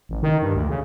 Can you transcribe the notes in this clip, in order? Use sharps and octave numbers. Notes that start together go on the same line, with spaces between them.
A1
D#3
G2
D2
C#3